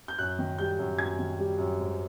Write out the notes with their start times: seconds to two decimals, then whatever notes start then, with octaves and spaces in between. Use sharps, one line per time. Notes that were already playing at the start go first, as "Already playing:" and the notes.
0.08 G6
0.18 F#2 F#6
0.39 D#3
0.59 G3 G6
0.79 F#2
0.99 F#2 G#6
1.19 D#3
1.38 G3
1.58 F#2
1.79 G#2